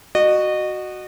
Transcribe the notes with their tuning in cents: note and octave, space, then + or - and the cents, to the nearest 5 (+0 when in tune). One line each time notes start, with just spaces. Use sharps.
F#4 +0 D#5 -30